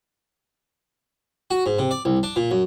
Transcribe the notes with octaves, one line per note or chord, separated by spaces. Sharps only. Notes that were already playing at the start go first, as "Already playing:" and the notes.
F#4
G#2
C3
D5
C2
D4
A#2
F#2